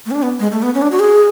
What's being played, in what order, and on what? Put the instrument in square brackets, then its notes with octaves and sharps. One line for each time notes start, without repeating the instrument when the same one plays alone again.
[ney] A3
C#4
D4
B3
G#3
A3
B3
C#4
D4
F#4
G#4